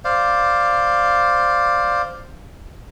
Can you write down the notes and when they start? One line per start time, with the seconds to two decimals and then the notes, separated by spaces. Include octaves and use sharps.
0.04 C5 D5 F5